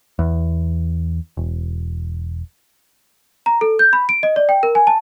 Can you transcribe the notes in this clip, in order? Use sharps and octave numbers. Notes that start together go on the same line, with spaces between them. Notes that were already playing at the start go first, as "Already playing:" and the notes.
E2
E1
A#5
A4
G6
B5
D7
D#5
D5
G5
A#4
G#5
A5